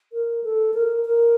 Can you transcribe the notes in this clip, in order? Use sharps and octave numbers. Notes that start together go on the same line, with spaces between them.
A#4
A4
A#4
A#4